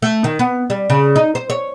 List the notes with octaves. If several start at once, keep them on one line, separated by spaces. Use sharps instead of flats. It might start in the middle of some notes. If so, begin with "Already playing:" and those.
A3
D#3
B3
G3
C#3
D#4
C5
C#5